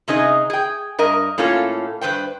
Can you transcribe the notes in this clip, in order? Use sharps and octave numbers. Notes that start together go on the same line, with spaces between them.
C3 C#4 D#4 G#4 D#5
G#4 G5
G2 A#4 D#5
A2 A#3 C#4 F4 A4
G2 F3 B4 C5 G5